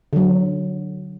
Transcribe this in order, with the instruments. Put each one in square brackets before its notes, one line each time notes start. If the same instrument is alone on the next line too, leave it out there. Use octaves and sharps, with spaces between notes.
[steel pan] D3 F#3